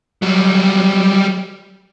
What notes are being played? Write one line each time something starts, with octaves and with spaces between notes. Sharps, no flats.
F#3 G3